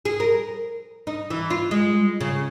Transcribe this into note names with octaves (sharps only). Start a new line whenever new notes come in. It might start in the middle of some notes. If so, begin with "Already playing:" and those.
G#4
A#4
D#4
E3
F4
G#3
C#3